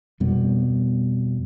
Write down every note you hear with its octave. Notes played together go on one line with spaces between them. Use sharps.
F2 B2 G3 B3